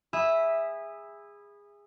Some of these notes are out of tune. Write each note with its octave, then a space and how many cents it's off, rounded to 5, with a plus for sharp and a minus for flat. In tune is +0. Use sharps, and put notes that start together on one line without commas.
G#4 -20 E5 +0 B5 -5